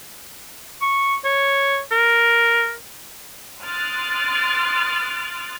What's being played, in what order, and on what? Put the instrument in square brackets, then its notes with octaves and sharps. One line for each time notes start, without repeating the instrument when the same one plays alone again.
[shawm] C#6
C#5
A#4
[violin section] C6 D#6 F6 F#6 A6 D7